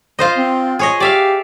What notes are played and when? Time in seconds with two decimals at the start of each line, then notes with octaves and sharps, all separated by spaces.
0.19 F4 C5 D#5
0.37 C4
0.79 G#4 C#5 D#5
1.00 G4 D5 E5 F5